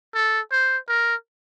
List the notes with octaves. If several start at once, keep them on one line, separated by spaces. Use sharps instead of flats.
A4
C5
A#4